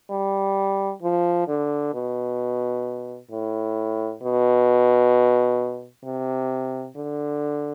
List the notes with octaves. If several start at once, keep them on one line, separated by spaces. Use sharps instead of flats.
G3
F3
D3
B2
A2
B2
C3
D3